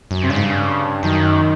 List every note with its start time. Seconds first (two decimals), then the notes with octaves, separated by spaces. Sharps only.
0.11 F#2
0.23 C3
0.29 G2 C#3
0.36 G#2
0.44 G2
1.03 F#2 D#3